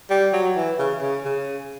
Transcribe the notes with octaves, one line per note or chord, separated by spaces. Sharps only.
G3
F#3
E3
C#3
C#3
C#3